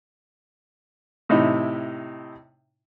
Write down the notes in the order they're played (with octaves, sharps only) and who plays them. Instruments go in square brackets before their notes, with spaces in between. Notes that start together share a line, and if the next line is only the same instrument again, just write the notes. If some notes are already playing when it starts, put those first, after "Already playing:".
[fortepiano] A2 C3 D#4 E4